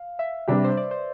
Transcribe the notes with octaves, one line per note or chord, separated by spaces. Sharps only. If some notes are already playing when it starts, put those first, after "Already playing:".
Already playing: F5
E5
C3 G3 D4 G4 B4
C5
D5
C5